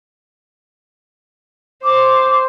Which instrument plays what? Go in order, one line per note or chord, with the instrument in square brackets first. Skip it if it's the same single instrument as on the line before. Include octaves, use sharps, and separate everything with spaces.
[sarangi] C5 [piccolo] D6